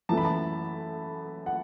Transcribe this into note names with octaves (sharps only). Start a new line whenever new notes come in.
F#2 E3 A3 A5
B5
A5
F#5